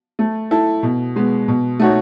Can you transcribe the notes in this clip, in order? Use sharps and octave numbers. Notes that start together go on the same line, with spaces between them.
A3
E4 A4
B2
G#3 B3
B2
A3 D#4 F#4 C#5